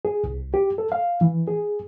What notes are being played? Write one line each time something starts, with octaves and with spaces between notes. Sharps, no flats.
G#4
C2
G4
A4
F5
E3
G#4